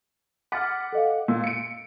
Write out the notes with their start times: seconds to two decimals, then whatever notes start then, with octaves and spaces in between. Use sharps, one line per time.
0.52 F#5 D6 F6 A6 B6
0.93 A4 D#5 F5
1.28 A#2 E6
1.44 C#7 D7